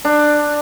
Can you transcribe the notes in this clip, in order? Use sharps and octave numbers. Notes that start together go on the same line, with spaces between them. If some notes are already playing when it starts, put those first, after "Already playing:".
D4